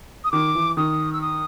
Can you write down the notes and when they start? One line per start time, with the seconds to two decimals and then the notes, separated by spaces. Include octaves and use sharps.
0.24 D#6
0.32 D#3 D6
0.55 E3
0.77 D#3 D#6
1.13 E6
1.22 D#6